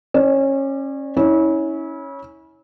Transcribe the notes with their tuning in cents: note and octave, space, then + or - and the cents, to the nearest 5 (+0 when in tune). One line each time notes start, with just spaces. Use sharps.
C#4 -25 D5 +10
C#4 +0 E4 -35